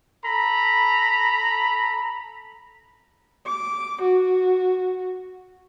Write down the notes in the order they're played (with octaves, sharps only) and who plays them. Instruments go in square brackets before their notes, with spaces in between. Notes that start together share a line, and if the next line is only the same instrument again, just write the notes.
[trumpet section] A4 A#5 B5
[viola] D6
F#4